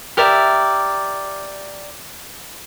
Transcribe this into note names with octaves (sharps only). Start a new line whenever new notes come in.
G4 A#4 D5 E5